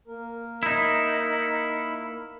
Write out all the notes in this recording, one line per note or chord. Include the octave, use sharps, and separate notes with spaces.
A#3 A#4
D#4 E4